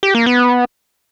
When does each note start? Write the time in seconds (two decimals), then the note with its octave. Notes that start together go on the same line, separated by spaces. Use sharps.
0.03 G4
0.15 A#3
0.26 B3